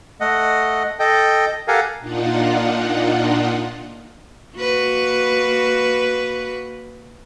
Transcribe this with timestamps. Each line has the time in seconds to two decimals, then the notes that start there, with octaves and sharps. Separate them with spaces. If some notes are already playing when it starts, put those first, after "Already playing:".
0.21 A3 D#5 F#5
0.99 A4 D#5 G5
1.68 G4 A4 A#4 F5 F#5 G#5
2.00 A#2 D4 D#4 F4 F#5
4.56 A#3 F#4 B4